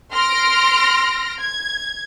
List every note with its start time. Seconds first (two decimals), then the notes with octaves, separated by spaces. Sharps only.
0.12 C6 F6 A#6 D7
1.41 G#6